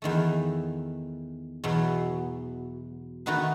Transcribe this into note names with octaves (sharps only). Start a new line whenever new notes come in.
E2 D#3 A3
E2 B2 F#3
D#3 A3 D#4 F#4 B4